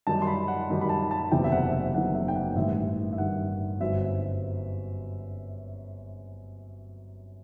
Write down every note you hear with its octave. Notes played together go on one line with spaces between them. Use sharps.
F#2 D#3 G3 D#4 A5
C6
B5
F#5
F#2 D#3 G3 D#4
B5
A5
A5
F#1 E2 C3 D#3 F#3 G5
E5
F#5
E5
F#1 E2 C3 D#3 F#3 F#5
E5
G5
F#5
A1 G2 D#3 E5
E5
A1 G2 D#3 F#5
G1 F#2 F#3 C4 D#4 E5